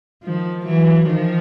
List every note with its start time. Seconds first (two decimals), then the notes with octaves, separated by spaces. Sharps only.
0.23 D#3 F3
0.66 E3 F#3
1.07 D#3 F3